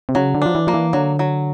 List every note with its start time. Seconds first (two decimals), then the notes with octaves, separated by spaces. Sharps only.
0.09 C3
0.15 C#3 F#3
0.35 D3
0.42 F3 D4
0.55 E3
0.67 F3 A#3
0.74 E3
0.93 D3 F#3
1.19 F#3